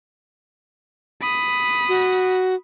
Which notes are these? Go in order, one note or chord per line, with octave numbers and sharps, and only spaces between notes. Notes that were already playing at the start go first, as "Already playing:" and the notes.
B5 D#6
F#4